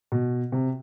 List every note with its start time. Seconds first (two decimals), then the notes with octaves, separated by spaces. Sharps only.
0.12 B2
0.52 C3